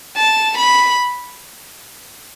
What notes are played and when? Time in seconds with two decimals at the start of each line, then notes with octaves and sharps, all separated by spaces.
0.17 A5
0.58 B5